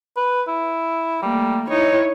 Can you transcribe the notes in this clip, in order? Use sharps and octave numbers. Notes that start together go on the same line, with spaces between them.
B4
E4
G3 A3 A#3
D#4 E4 C#5